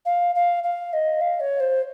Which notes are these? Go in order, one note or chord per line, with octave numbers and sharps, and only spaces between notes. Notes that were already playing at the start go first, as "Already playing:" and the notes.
F5
F5
F5
D#5
F5
C#5
C5